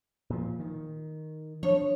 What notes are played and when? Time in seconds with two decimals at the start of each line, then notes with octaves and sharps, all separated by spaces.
0.30 A#2 F3
0.60 D#3
1.63 F3 D4 C#5